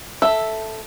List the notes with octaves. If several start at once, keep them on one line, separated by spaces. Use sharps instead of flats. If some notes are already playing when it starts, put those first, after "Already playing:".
A4 E5